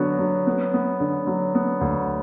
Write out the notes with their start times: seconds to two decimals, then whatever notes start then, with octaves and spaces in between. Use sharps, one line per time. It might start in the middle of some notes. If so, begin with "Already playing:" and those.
Already playing: D3 F#3 B3 F#4
0.19 F#3
0.47 B3
0.74 B3
1.00 D3
1.27 F#3
1.55 B3
1.81 D2